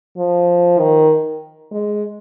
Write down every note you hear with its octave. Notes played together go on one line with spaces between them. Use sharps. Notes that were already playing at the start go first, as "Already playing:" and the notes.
F3
D#3
G#3